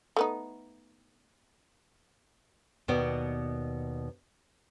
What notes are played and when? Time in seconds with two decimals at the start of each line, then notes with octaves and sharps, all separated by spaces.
0.17 A3 B3 D#4
2.88 D#2 B2 B3 D5